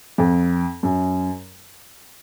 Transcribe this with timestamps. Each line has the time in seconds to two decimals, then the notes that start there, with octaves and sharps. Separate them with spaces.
0.18 F2
0.83 F#2